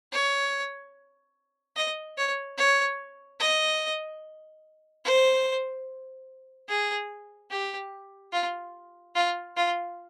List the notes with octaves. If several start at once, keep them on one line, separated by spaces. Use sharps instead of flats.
C#5
D#5
C#5
C#5
D#5
C5
G#4
G4
F4
F4
F4